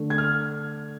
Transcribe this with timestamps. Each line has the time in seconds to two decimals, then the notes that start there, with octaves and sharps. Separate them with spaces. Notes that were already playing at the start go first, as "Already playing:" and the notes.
Already playing: D3 A3
0.10 G#6
0.18 F6